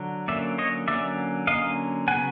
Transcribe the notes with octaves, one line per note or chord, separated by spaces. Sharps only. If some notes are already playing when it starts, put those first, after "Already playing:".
Already playing: D3 F#3
D3 F#3 A#3 C#4 D5 E5
C#5 D#5
D3 F#3 A#3 C#4 D5 E5
D3 F#3 A#3 C#4 D#5 F5
C#3 F#3 B3 F#5 G#5